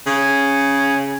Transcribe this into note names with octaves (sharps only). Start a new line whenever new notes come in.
C#3